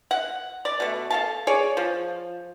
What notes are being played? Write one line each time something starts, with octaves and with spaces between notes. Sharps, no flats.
F#5
D5
B2 A3
A4 F5 A5
G#4 C#5 D5
F3